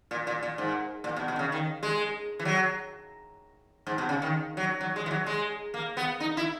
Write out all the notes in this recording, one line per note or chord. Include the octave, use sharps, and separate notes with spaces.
A#2
A#2
A#2
G#2
A#2
B2
B2
D#3
C#3
D#3
G#3
E3
F#3
G#2
B2
C#3
D#3
F#3
F#3
G#3
E3
F#3
G#3
A#3
B3
D#4
E4